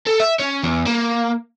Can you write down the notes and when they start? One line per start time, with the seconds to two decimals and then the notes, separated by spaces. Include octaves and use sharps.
0.06 A4
0.20 E5
0.40 C#4
0.63 E2
0.86 A#3